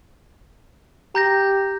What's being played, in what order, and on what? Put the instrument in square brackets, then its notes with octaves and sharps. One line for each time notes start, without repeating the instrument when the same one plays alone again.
[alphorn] G4 [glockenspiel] A#5 G6 A#6